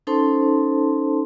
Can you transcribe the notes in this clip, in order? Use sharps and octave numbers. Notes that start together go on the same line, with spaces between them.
C#4 D#4 A4 C5 A5 C6